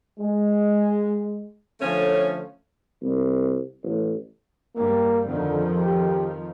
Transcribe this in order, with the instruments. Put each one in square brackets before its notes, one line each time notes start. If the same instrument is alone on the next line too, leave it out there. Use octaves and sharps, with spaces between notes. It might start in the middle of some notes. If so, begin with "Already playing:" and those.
[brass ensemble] G#3
[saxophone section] D3 F3 A3 C#4
[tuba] C2
A1
[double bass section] G2 G3 [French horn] A#3
[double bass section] F2 D#3 F3 [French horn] D3
[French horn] G4